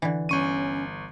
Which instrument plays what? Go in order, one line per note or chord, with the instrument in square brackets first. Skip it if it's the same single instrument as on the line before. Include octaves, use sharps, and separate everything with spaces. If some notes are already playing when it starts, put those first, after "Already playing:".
[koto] D3 E3
[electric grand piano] G1 C#6 D#7 [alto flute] C#4